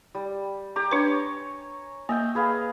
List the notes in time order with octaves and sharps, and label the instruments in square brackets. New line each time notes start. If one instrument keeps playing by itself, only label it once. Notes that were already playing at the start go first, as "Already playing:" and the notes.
[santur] G3
G4 A#5 D6
[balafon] D4 B4 [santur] C#5 G#5
[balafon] A#3 [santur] D#5 E5 G5
[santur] G#4 B4 F5